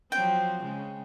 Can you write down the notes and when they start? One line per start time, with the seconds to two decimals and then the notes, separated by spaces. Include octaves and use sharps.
0.12 F3 F#3 C4 G5
0.63 C#3 G#3